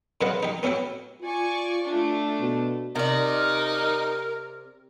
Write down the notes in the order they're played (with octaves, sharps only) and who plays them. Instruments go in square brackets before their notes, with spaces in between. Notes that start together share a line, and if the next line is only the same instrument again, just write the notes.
[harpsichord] F#2 C#3 F4 B4 D#5 F#5
D#4 G4
B3 C#4 E4 F#4 G4
[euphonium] F4 [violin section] D5 G#5 C#6
[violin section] A3 D4
[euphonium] B2
[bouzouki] C3 D5 [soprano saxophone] D#4 [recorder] A#4